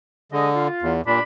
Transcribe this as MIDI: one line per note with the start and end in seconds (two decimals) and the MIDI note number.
0.32 0.68 50
0.32 0.49 56
0.32 0.49 75
0.56 0.93 65
0.82 1.01 40
1.06 1.23 43
1.06 1.20 46
1.06 1.23 62
1.06 1.23 83